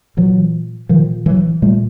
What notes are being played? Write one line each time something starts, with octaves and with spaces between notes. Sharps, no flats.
A#2 E3 F#3
A#2 D#3 F3
E3 F#3
A#2 G3 A3